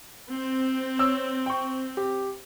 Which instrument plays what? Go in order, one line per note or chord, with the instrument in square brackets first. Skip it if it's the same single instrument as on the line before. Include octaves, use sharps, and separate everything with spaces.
[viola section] C4
[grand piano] C#5 E6
G5 C#6
G4